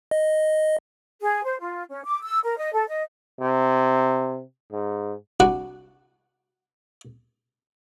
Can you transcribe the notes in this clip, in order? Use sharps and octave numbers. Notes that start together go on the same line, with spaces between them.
D#5
G#4
C5
F4
C#4
D6
E6
A#4
D#5
A4
D#5
C3
G#2
C2 D4 F#4 F#5